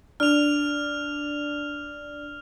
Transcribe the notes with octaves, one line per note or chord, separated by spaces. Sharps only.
D4 F6 F7